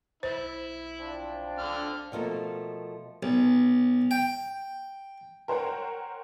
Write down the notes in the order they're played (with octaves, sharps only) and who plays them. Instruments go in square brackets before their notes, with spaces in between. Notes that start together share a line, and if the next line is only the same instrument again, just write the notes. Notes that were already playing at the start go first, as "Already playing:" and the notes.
[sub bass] B1 [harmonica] E4 [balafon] C5
[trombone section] F3 C4 D4
[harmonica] D3 F6
[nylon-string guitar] B2 F3 A3 A#3
[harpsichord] B1
G5
[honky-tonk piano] A#4 C5 C#5 F#5 G5